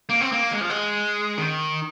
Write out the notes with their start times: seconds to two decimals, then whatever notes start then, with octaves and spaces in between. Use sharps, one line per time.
0.09 A#3
0.21 C4
0.32 A#3
0.52 G#3
0.61 F3
0.70 G#3
1.37 D#3